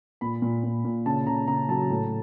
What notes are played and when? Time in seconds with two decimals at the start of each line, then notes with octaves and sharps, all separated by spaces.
0.21 A#2 B5
0.42 A#2
0.64 A#2
0.85 A#2
1.06 C#3 A5
1.26 C#3 A#5
1.48 C#3 A#5
1.69 F#3 A5
1.90 A2